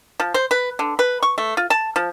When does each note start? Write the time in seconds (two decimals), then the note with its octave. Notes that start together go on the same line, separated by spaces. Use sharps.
0.20 F3
0.34 C5
0.51 B4
0.79 D3
0.99 B4
1.23 C#6
1.38 A3
1.57 F4
1.70 A5
1.96 F3